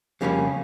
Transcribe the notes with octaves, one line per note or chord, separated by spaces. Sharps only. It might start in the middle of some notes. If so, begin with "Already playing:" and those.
F2 C#3 G3 A#3 C#4